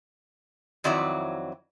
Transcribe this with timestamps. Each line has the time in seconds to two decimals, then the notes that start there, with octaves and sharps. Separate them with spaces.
0.84 F2 D#3 F#3 C4 E4 D5